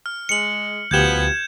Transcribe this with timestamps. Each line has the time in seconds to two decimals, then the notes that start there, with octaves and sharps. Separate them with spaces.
0.06 F6
0.29 G#3 C#7 F#7
0.91 D2 B2 F3 B3 G4 G6 G#6 E7